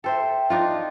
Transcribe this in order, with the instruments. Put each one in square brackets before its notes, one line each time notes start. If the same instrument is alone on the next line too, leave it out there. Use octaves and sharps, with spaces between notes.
[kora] A4 C5 E5 [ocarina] G5
[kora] D4 D#4 F4